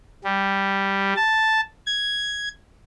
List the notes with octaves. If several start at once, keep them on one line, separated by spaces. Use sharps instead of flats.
G3
A5
G#6